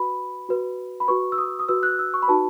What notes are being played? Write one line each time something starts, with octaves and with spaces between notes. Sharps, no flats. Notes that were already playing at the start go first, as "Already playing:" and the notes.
Already playing: F#4 B4 B5
F#4 B4
B5
F#4 B4 C#6
E6
D#6
D#6
F#4 B4 E6
F#6
E6
C#6
B5
D#4 F#4 B4 A5